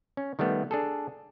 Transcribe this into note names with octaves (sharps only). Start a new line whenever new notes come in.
C#4
D#3 G3 A3 B3
D4 G#4 A4